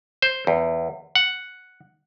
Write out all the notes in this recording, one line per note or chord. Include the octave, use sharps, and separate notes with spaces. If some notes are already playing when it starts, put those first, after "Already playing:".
C5
E2
F#5